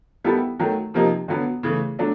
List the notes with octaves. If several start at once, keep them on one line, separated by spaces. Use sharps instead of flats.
D#3 G3 B3 E4 A4
D#3 F#3 A3
C3 F3 A#3 D#4
D3 F#3 B3
C#3 E3 A3
F#3 A3 D4